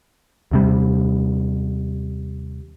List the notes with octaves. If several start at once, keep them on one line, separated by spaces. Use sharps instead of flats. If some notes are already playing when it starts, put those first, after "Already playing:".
D#2 C3 G3